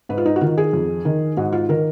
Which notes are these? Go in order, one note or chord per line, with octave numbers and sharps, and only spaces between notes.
G#2 B4
F4
D#4
F#4
D#3 F4
G#4
F2
D#3
G#2 F#4
F4
D#3 A#4